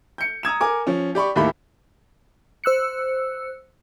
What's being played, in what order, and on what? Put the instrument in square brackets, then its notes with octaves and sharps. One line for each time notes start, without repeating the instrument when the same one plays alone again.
[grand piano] G6 C#7
A#5 D#6 G#6 E7
A#4 G#5 D6
F3 C#4
G4 D5 B5 C#6
D#2 A2 A#3 G4 E5 B5
[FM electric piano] C5 E6 F#6 C#7